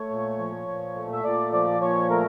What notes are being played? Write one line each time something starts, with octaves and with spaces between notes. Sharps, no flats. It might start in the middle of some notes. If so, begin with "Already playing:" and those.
Already playing: A3 C#5
A#2
F3
A#2
A3
E5
A#2 D5
F3 D5
A#2 C#5
A3 A#4